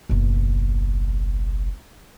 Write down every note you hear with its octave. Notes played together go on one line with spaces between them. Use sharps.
F#1 B1